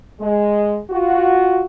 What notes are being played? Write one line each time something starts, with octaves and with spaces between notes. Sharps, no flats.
G#3
F4 F#4